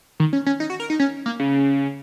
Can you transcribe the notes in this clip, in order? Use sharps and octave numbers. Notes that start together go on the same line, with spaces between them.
D#3
C#4
C#4
D#4
F#4
A#4
D#4
C#4
A#3
C#3